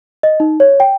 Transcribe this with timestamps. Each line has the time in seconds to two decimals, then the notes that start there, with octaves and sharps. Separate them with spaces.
0.23 D#5
0.40 D#4
0.60 C#5
0.80 G5